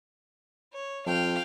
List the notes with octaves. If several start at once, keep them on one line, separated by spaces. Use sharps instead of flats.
C#5
F2 F5 G5